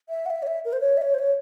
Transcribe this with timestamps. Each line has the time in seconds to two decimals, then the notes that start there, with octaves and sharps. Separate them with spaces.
0.09 E5
0.26 F#5
0.30 E5
0.42 C#5
0.47 E5
0.65 A#4
0.73 C5
0.81 C#5
0.97 E5
1.02 C#5
1.14 C5
1.18 C#5